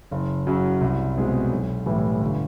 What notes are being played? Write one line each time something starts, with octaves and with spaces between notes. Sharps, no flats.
F#1
F#2 C#3 F#3
C2
B2 G#3 C4
B1
A2 E3 G3
G1